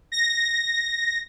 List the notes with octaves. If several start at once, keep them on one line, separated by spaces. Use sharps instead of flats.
A#6